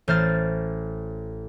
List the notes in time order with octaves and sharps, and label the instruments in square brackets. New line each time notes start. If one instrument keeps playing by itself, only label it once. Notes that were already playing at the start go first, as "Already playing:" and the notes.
[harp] A1 C5 F6 A6